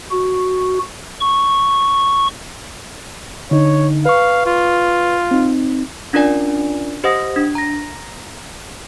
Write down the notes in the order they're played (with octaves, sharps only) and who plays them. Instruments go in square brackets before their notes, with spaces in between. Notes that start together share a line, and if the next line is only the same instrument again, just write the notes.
[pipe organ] F#4
C#6
[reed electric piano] D3 D#4 [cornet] C#5
[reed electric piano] B4 C#6 [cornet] F5
[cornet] F4
[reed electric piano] C4 D#4
[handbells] C#4 D4 F4 A#4 D5 G#5
G4 C5 D#5 F#5 D#6 A#6
D4
A#5 A#6